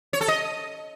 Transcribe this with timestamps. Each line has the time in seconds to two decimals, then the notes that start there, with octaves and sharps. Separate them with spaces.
0.13 C#5
0.21 A4
0.28 D#5